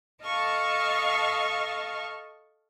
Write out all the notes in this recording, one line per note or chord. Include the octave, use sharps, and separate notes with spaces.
A4 D#5 F5 A5 C#6